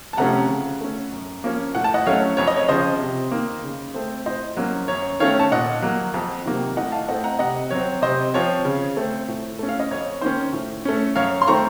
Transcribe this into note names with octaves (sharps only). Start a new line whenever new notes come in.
A5
C3 F3 A3 C#4 F#5 A#5
C#3
A3 C#4
F#2
F3 A#3 C#4
A2 F#5
A5
D#5 F#5
F#3 A3 C#4 C#5 F5
F2 C#5
D#5
C#5
C#3 F3 C4 C5 D#5
C3
D#3 A#3
C#3
A3 C4
A2 C5 D#5
F#3 A#3 C#4
F#2 C#5
D#3 A3 C#4 C#5 F5
A5
A#2 D#5 F#5
F#3 A#3
F2
C3 D#3 F#3 A#3
A2 D#5 F#5
F5 A5
A3 C4 D#5 F#5
F#5 A#5
C3 D#5 F#5
F#3 C4 C#5
C3 C5 D#5
F3 C4 C#5
C#3
A3 C4
A2
A3 C#4
F5
D#5
F2 C#5
D#3 A#3 C#4 C5
A2
A3 C#4
F#2 C#5 F5
C6
D#3 A3 C4 A#5 C#6